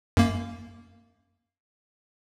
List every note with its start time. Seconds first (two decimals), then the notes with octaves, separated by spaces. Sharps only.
0.17 F#2 A#3